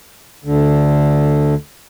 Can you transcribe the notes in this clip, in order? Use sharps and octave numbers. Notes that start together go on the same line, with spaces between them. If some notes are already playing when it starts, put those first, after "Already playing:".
D2 D3